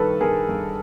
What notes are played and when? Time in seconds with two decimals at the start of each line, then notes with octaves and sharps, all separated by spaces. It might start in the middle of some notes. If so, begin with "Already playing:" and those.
Already playing: G2 D#3 A4 B4
0.21 G2 G#4 A#4
0.49 G2